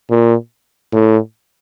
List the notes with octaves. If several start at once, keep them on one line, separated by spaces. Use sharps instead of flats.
A#2
A2